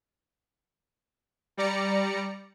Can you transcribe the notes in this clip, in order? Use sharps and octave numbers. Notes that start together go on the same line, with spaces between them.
G3 D5 A#5 C#7